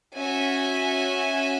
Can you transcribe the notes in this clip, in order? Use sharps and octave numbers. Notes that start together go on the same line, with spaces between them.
C#4 F#4 E5 G#5